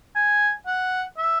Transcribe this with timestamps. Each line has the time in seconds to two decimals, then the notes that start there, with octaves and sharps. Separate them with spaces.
0.15 G#5
0.67 F#5
1.18 E5